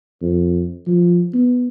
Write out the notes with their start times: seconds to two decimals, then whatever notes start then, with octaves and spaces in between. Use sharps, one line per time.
0.22 F2
0.87 F3
1.34 B3